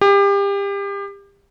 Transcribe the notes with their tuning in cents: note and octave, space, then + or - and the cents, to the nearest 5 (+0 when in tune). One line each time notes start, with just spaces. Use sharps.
G4 +30